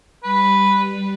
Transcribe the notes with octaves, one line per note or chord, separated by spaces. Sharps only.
G3 B4